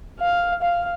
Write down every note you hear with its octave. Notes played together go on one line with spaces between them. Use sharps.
F5
F5